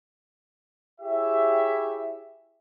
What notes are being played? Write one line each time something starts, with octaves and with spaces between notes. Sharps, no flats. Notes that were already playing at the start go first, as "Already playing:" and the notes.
E4 G4 G#4 C#5 E5